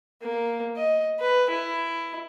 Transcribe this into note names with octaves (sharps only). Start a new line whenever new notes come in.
A#3
D#5
B4
E4